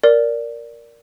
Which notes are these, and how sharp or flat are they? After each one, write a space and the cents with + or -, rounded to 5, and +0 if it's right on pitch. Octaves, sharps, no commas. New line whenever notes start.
A#4 +0 D5 -5